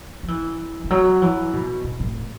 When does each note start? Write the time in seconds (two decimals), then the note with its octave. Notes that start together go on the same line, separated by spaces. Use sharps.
0.23 F#3
0.28 E3
0.84 E3
0.90 F#3
1.22 E3
1.53 B2
1.84 B2
2.00 A2